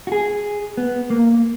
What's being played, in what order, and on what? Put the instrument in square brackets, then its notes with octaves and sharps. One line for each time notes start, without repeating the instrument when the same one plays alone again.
[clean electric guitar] F#4
G#4
B3
A#3